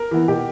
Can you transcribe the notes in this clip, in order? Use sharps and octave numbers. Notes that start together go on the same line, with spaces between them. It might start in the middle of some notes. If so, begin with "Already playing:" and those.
Already playing: A#4
E3 B3
B2 G4